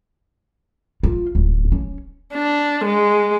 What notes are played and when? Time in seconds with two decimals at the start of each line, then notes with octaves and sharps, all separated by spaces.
1.03 F4
1.35 D1
1.72 C#4
2.33 D4
2.85 G#3